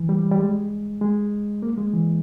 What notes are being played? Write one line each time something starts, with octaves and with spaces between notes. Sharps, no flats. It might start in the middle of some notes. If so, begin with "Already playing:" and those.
Already playing: E3
G3
G3
G#3
G#3
A#3
G#3
E3